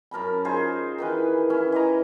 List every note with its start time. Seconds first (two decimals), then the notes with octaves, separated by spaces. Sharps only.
0.11 F#2 A#4 A5 B5
0.45 D#4 F4 G#4 C5
0.98 D#3 E3 B4
1.50 C#4 E4
1.72 E3 D#5 A#5